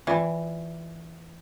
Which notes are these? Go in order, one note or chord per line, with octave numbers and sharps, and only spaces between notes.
E3 F4 D5 G5